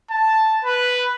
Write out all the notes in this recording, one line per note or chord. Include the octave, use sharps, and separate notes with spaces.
A5
B4